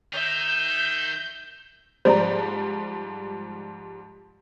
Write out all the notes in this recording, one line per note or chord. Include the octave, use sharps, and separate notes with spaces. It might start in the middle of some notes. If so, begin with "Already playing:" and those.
D#3 D#4 E5 G6
G#2 F3 G3 C5 D5 A#5